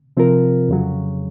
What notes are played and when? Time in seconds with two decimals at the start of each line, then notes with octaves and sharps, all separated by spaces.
0.17 C3 F3 C4 F4 A#4
0.69 F2 C#3 F#3